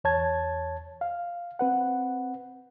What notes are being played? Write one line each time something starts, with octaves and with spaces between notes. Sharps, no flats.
E2 C#5 A5 G#6
F5
C4 B4 F#5